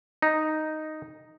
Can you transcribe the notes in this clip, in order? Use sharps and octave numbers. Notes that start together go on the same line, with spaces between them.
D#4